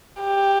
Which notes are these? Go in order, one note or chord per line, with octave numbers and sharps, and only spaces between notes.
G4